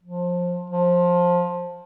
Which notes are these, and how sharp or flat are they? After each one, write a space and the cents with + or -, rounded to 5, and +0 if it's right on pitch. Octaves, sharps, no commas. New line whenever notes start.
F3 +20
F3 +15